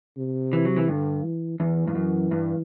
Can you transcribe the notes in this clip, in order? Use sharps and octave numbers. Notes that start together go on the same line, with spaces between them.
C3
E3
F#3
E3
G2 D3
E3
E2 E3
G2
F#2
G2